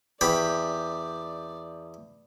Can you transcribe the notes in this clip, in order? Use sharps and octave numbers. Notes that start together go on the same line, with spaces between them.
E2 G4 D5 B5